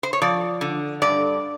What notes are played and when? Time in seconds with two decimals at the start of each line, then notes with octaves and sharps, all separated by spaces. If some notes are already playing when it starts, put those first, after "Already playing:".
0.03 C5
0.13 C#5
0.22 F3 D5
0.61 D3
1.02 G2 D5